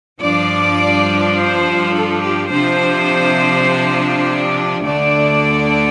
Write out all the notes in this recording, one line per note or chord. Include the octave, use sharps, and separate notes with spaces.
G2 F3 D4 D5
C5
A4
G4
C3 F3 D4 C5
D5
D2 D3 A3 D4 D5